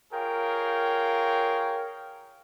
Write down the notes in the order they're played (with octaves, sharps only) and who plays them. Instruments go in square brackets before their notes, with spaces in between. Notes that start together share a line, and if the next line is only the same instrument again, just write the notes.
[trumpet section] F4 G#4 A#4 C#5 F5 G5